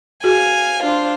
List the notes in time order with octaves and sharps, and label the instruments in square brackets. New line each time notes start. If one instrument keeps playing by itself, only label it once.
[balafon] F#4 G#4 [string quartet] F5 G#5
[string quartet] D4 F4 C5